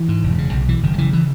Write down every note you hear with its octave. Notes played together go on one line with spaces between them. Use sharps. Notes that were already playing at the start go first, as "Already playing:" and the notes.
Already playing: E3
G#2
E1
C#3
B1
B2 E3
F#1 D#3
F#3
C#3 E3
E3